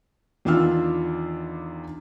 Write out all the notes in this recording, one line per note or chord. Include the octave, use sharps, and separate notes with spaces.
E2 D#3 D4 F4 E6 F6